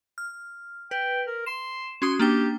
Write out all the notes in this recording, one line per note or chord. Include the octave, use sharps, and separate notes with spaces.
F6
B4 G5
A#4
C6 E7
C#4 F#4 C6 D#6
A#3 D4 G4 G5